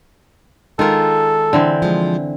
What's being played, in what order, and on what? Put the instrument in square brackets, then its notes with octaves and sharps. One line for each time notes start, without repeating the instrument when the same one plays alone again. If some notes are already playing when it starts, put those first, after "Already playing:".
[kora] D#3 F4 [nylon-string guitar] G#3 A#4 [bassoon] A4
[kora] D3 E3 C4
[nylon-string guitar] F3 G#3